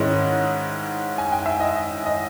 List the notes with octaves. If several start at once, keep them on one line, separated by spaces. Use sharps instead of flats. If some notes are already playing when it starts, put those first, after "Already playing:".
Already playing: G#2 D#3 G#3 C#4 E4 D#5
G#5
G5
E5
D#5
D#5